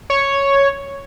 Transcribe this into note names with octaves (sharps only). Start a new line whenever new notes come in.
C#5